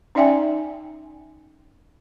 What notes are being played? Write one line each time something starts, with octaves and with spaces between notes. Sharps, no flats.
C#4 D#4 D5 E5 G5 G#5